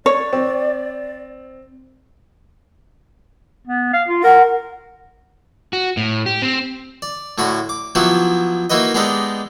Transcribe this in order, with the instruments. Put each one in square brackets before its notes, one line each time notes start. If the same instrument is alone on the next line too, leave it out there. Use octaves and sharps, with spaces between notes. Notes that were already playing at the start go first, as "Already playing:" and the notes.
[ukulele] C#5 [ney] D5
[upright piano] C4
[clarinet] B3
F5
F4
[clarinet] A#4 [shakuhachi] F#5
[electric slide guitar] F#4
A2
G4
C4
[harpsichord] D5
A2 D3 F#4 B5
D6
F3 F#3 B3 E4 F#4 G4
A#3 D#4 E4 F#4 B4 D#5
G#3 B3 D4 D#4 G4 A4